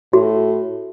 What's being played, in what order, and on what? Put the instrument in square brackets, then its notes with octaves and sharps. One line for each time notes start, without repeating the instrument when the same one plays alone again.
[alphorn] A2 [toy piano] F#4